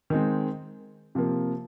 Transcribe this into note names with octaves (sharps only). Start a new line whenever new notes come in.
D#3 G#3 C4
C3 F3 A#3